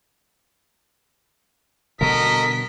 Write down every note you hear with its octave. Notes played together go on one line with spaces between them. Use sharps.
B2 D3 G3 F#4 A4 A#4 D#5 B6